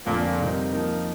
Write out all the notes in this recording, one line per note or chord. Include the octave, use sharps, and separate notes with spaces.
F2 A#2 D3 F3
C3 G3 C4 D#4 A#4
F3 A#3 D#4 A#4